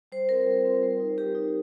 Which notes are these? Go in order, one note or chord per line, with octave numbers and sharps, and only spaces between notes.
G3 C5
C4 F4 A#4
G3
C4 F4
G3
D#4
G3 G4
D#4